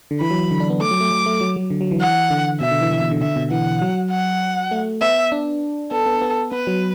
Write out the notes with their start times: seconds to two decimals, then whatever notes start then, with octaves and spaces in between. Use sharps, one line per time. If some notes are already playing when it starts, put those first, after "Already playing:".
0.11 D3
0.20 E3 B5
0.31 F#3
0.51 D3
0.60 D4
0.70 B3
0.80 A3 D6
0.91 F#3
1.00 A3
1.11 F#3
1.26 A3
1.41 F#3
1.56 F#3
1.70 D3
1.81 F#3
1.91 E3
2.01 F#5
2.31 D3
2.60 B2 E5
2.71 D3
2.81 E3
2.91 E3
3.01 B2
3.11 D3
3.21 D3 E5
3.36 B2
3.51 E3 F#5
3.82 F#3
4.11 F#5
4.71 A3
5.01 B3 E5
5.32 D4
5.91 B3 A4
6.06 B3
6.22 B3
6.52 B3 B4
6.67 F#3